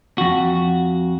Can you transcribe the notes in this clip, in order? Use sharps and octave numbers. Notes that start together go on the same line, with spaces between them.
F2 F#4